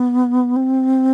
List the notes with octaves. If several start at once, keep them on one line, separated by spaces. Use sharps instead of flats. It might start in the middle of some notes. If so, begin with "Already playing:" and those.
Already playing: B3
C4